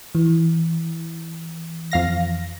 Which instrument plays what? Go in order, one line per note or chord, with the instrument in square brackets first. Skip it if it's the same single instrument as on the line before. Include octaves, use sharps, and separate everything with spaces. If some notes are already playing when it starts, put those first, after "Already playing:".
[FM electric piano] E3
[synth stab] F2 F5 A#6